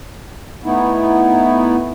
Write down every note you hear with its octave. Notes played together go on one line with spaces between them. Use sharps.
A3 B3 D#4 E4